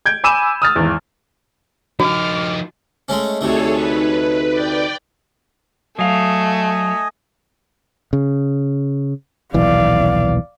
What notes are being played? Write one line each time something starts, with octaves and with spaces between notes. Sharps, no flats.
G6 G#6 D7
G#5 B5 D6 E6 D#7 E7
D#6 F6 A6
G#1 E2
F3 D#4 F#4 D6 F6
G#3 A3 C#4
D2 C3 A3 D#4 G#4 A4 C#5
B4
D5 G5
F#3 A3 D#5 F5 G#5 D#6
C#3
D#1 B1 E3 D5 F5